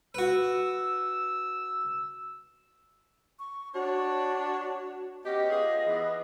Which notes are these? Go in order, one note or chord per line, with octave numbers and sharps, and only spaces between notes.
F#4 B4 E6
C#6
D4 F#4 C#5
B3 C#4 G4 D#5
B3 F4 G#4
E3 B3